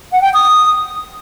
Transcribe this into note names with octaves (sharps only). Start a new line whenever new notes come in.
F#5
G5
D#6